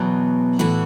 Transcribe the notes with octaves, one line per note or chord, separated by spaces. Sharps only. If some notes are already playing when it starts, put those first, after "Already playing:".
Already playing: E2 B2 F#3
A2 E3 F#4